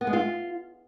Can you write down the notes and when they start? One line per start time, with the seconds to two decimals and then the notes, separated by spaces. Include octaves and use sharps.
0.01 B3
0.07 G#3
0.13 F4